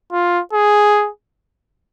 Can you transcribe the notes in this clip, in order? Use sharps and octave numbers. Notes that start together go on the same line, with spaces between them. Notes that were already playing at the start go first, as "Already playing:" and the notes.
F4
G#4